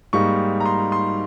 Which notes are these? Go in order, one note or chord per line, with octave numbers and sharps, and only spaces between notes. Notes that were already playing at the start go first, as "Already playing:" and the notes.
G#2 G3 A#3 D#4 C#6
A#5
C6
C6